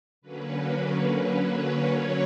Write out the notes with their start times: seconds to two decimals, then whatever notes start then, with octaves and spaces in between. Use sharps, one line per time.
0.22 D3 F#3 A#3 C#4 B4
1.41 C#5